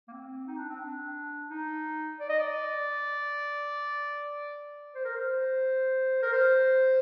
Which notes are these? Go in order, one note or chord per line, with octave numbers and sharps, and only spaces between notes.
A#3
C4
D#4
D4
C4
D4
D#4
D5
D#5
D5
C5
A#4
C5
A#4
C5